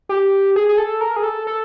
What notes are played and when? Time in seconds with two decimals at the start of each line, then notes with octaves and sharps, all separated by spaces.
0.09 G4
0.56 G#4
0.69 G#4
0.78 A4
1.01 A#4
1.16 G#4
1.23 A4
1.47 A4